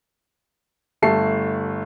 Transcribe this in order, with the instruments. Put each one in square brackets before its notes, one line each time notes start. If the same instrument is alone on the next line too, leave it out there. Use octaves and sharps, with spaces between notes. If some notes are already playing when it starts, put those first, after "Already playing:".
[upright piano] G1 A3 A5 C7